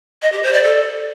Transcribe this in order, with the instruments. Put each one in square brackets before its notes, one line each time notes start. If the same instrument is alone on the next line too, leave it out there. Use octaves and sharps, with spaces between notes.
[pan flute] D#5
G4
C5
D5
A4